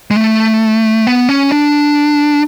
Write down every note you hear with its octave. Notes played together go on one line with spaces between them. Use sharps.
G#3
A3
B3
C#4
D4